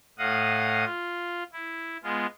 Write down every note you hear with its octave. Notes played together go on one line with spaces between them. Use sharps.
A2 D#5 F5 F#5 D#6
F4
E4
G#3 B3 F4